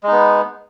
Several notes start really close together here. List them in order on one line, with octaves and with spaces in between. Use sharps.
G#3 D#4 B3